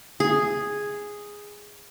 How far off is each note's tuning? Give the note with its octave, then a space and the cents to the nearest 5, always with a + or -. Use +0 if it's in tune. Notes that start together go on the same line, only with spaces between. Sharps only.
G#4 -5